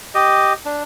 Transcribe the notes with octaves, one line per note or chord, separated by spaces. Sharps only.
G4 D#5
D4